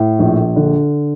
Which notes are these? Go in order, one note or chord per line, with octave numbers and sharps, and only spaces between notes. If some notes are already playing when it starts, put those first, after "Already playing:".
Already playing: A2
A#1
D3